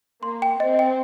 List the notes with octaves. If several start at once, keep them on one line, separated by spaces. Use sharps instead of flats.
A#3 C6
G5
C4 D#5
G5